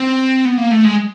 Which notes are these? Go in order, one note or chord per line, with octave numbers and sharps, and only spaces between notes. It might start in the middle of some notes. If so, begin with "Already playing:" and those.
Already playing: C4
B3
A#3
A3
G#3